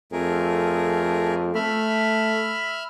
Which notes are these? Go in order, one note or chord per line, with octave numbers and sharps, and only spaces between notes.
F2 A3 G#4 A#4
A3 E5 B5 F6